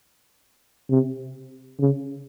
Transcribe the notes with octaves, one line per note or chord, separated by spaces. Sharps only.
C3
C#3